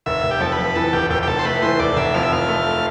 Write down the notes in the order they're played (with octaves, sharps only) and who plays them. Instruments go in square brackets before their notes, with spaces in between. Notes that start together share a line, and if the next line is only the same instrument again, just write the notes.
[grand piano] F1 [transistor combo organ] E5
[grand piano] F1
[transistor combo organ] G4
[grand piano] F2 [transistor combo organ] A4
[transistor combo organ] B4
[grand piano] F2
[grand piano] E3 [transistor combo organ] A4
[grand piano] F1 [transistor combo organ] G4
[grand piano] F1 [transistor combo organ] G4
[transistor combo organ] G4
[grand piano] F1 [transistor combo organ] A4
[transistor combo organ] C5
[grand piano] A3 [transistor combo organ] B4
[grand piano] E3 [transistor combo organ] C5
[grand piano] F1 [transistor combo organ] D5
[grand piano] F1 [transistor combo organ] E5
[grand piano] F2 [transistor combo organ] F5
[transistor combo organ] E5
[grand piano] F1 [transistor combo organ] F5
[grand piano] A3